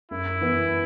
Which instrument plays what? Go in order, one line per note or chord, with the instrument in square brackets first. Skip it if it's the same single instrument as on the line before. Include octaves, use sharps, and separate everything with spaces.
[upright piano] F#2 [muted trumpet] E4
[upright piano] E3 B3